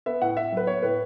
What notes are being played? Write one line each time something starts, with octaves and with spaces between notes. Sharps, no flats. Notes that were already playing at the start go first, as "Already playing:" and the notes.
B3 E5
A2 F#5
A2 E5
F#3 B4
B3 C#5
A2 B4